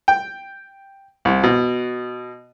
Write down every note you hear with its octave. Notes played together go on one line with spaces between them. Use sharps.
G5
C2
B2